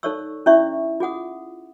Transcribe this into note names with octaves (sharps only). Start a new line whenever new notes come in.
D#4 A4 C#5 D5 C#6 E6
C#4 E4 D5 E5 C#6
F4 G#4 F#5 D#6